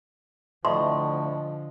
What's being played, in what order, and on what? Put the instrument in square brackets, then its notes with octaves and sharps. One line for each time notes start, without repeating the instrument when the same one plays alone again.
[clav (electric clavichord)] D2 A2 [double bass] D3 F3 [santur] D#5 [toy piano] C6